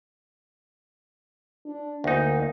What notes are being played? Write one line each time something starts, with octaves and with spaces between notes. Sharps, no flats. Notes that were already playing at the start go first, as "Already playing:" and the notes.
D4
D2 A#3 D#4